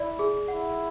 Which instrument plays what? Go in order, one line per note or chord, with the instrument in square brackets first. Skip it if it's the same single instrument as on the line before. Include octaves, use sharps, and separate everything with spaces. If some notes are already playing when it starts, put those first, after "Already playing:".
Already playing: [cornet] E4 [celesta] D5
[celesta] G#4
[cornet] E4 [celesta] F#5